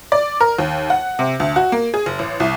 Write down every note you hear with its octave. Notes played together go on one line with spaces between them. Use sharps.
D5
A#4
D#2
F#5
C3
D2
F#4
A#3
G#4
F#1
A1
C2